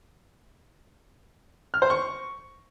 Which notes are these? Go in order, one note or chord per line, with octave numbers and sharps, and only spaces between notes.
F6
C5
C#6